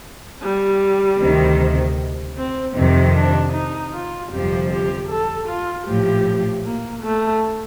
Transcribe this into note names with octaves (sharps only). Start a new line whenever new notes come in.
G3
D2 C3 D#3
C4
F2 C3 D#3 C4
D4
D#4
F4
G1 F2 C3 F3 G4
G4
A4
F4
A#1 A2 F3 G4
A#3
A3